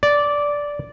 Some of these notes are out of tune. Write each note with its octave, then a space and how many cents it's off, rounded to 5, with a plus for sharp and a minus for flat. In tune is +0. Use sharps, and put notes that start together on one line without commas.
D5 -10